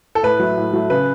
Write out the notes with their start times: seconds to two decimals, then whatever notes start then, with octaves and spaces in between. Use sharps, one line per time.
0.15 A4
0.23 A2 B4
0.40 F#3 A3
0.58 A2
0.73 F#3 A3
0.90 C#3 B4